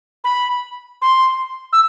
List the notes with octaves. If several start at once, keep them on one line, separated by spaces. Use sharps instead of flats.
B5
C6
E6